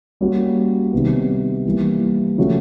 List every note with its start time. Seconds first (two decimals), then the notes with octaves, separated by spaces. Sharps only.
0.21 G3 A#3 C#4 F#4
0.93 C3 D#3 G3 B3
1.65 E3 G3 A#3
2.38 C#3 F3 A3 C#4 F#4